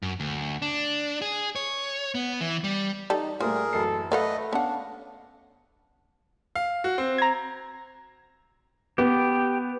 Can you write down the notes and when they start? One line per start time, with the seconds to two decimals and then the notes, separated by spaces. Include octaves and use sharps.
0.02 F#2
0.20 D2
0.62 D4
1.22 G#4
1.56 C#5
2.15 B3
2.41 E3
2.64 G3
3.10 G3 D#4 A4
3.40 A#2 G3 A3 A#3 G#4 A#4 C5
3.73 A1 F#2 A4 C7
4.12 A3 A4 B4 D5 D#5 F5 F#5
4.53 B3 C#4 D4 F5 F#5
6.55 F5
6.84 F#4
6.98 C4
7.18 A#5 G#6
8.98 B3 G4